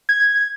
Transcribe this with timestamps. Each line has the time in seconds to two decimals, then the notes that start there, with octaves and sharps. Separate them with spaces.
0.09 G#6